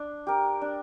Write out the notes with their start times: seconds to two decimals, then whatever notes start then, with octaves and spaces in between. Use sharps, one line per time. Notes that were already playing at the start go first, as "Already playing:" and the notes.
Already playing: D4
0.27 G4 A#4
0.62 D4